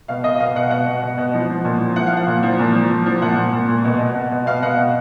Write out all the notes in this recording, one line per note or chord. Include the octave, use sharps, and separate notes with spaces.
B2 F5
B2 D#5
B2 F5
B2 F#5
B2 F#5
B2
B2
B2
F3
F3
A#2
F3
F3 F#5
F5
F3 F#5
A#2
F3
A#2
F3
A#2
F3
A#2 F#5
A#2
A#2
A#2
B2
B2
B2
B2
B2 F5
B2 F#5
B2